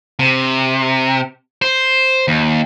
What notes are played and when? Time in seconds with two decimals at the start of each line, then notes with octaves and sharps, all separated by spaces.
0.19 C3
1.62 C5
2.28 D#2